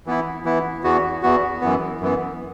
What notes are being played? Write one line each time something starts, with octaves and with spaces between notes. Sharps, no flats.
E3 B3 E4
E3 B3 E4
E2 E3 B3 F#4
E2 E3 B3 F#4
F#2 E3 B3
F#2 E3 B3